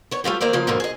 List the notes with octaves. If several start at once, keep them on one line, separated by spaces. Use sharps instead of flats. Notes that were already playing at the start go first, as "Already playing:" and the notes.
B3 C#5
G3 A3 F4 G4
E2 D#3 A#3 C4 D5
C#3 F3 A#3 F4
E2 G#2 B2 D3 A#3 B3
G#4 D#5